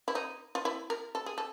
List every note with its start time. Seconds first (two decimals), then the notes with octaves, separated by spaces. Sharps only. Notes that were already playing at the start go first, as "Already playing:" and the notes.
0.08 E4
0.15 D#4
0.55 F4
0.65 E4
0.90 A#4
1.15 A4
1.26 G#4
1.38 A4